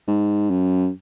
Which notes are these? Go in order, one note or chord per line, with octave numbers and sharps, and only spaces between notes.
G#2
F#2